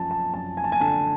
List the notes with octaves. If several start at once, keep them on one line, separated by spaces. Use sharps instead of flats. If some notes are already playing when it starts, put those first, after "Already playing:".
Already playing: F#2 F3 A5
A5
F#2 A5
G#5
A5
G#5
D3 A5